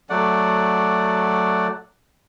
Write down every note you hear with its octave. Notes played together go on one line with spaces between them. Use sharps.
F#3 A3 D5 F#5